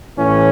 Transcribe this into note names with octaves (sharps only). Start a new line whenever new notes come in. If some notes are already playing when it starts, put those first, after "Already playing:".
A1 A2 E3 C#4